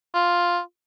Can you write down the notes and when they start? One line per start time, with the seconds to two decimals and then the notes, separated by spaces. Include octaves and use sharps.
0.14 F4